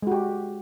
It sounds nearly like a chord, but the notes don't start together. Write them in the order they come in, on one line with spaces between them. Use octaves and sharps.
G#3 F#4 G4